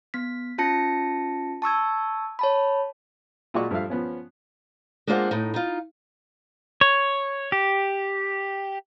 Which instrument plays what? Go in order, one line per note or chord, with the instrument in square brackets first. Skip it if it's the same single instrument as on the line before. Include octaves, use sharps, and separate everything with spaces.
[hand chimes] B3 B6
C#4 F4 A5 A#6 C#7
A5 C#6 E6 G#6
C#5 A5 B5
[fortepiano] A#2 G#3 F#4 D5 C#6
G2 F3 A3 E5 F5
F3 B3 C#4
[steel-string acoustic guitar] G#3 A#3 D4 F4 C5 F#5
A2 D#4
D#4 F4
[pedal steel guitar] C#5
G4